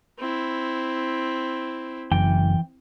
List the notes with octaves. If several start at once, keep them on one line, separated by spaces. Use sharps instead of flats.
C4 E4
F#1 E3 G5